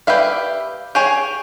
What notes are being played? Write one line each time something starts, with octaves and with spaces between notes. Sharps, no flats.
G4 B4 D5 E5 F5
G4 G#4 C#5